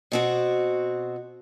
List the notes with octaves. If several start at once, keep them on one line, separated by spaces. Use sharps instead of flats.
B2 C4 F#4